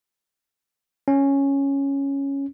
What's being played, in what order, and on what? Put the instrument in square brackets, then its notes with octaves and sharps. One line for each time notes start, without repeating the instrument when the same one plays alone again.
[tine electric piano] C#4